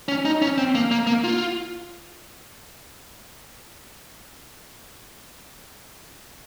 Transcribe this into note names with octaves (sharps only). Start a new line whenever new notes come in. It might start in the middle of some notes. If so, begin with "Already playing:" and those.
C#4
D#4
C#4
C4
A#3
A#3
A#3
F4